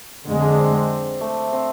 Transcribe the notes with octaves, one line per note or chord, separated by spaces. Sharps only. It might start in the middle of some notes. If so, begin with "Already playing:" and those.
F2 D3 G#3
D4
C4
C4
A3
C4